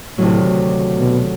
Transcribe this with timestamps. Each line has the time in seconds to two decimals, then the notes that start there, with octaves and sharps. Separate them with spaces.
0.18 D2 A2 C3 D#3 F#3
0.97 B2